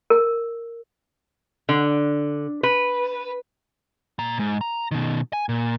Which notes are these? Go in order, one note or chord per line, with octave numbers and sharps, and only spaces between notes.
A#4
D3
B4
A#2 A#5
G#2
A#5
B2 D#3
G#5
A#2